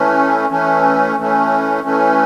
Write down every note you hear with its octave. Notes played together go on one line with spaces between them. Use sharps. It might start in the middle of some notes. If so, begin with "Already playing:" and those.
Already playing: E3 A3 C#4
E3 A3 C#4
E3 A3 C#4
E3 A3 C#4